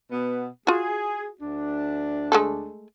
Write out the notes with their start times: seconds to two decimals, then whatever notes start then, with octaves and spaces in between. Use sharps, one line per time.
0.11 B2 B3
0.67 F4 F#4 G#4
1.41 D2 D4
2.32 G#3 A3 A4